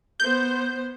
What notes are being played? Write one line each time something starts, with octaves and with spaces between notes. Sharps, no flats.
B3 C5 G6